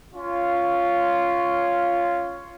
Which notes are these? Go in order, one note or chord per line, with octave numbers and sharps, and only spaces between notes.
C#4 F4